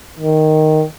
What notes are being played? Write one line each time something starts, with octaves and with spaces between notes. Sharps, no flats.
D#3